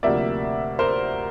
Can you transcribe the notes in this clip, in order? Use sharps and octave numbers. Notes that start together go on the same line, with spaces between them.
D2 C3 F3 A#3 D5 E5
A#4 C5